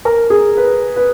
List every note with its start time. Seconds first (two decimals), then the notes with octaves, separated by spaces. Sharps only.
0.05 A#4
0.30 G#4
0.57 B4
0.96 B4